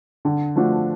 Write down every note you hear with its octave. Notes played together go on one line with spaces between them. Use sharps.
D3
F3 A3 D4 F#4